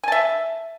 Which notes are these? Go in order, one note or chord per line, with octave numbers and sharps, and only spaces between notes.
E5 G#5 A5